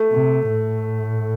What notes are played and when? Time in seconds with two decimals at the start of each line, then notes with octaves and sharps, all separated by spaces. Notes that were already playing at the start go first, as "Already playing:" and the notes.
Already playing: A3
0.11 C3
0.48 A2